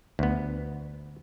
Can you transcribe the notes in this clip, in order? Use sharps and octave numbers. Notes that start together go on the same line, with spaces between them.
D2 B3